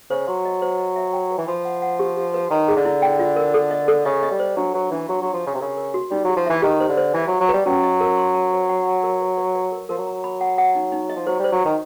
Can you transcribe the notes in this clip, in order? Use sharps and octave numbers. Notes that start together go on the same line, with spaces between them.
C#3 C5
F#3 C6
D#5
C5
D#5
E5
G5
B4
E3
F3 B5
F#5
F#5
G4
G4
B4
D#3 C#5
G#4
D3
E4
G5
F4
A#4
A4
D#5
A4
C#3 D#5
D#5
G3
C5
F#3 D4
F#3 B4
E3 D4
F#3 F#4
F#3 F#4
F3
C#3 D#5
C3
C#3 A#4
A#4
F#4
G3 D#4
F#3 G4
F3
E3 E5
D#3 G4
C5
D3
C5
E3 E5
F#3
E5
F#3
G3 B4
F#3 C#4
D#5
A#4
C6
A5
C5
F#5
F#5
A#4
B4
B4
B4
A#4
F3 A#4
F#3
A#5
B5
F#5
F#5
D#4
D#4
D#5
F3
F#3 C5
G3 C5
F#3
D#3 C5